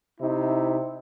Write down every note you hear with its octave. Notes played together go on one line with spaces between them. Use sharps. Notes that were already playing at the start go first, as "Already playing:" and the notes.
C3 D#4 E4